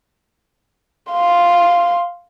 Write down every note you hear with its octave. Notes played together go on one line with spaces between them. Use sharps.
F5 C6